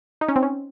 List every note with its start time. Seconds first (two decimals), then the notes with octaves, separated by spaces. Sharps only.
0.21 D#4
0.29 C#4
0.36 C4
0.43 C#4